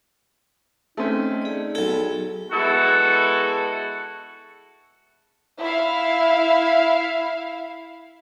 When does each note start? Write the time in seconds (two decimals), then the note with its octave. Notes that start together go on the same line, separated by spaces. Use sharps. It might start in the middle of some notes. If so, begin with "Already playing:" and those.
0.97 A3 C4 C#4 D#4
1.42 G#4 D5
1.75 B1 G#4 A4
2.52 G#3 B3 E4 F#4 A4
5.58 E4 E5 F5